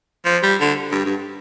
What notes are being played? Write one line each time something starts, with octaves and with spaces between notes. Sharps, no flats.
F3
G3
D3
G2
G2